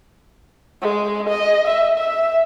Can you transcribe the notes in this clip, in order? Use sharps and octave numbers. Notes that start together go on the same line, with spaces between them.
G#3
D#5
E5
E5